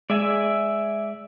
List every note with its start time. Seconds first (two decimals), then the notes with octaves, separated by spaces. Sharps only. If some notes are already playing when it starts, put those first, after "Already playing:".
0.10 G#3 D5 E5 G#5